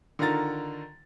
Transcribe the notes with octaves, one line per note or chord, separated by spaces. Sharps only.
D3 D#3 F4 A#5 A6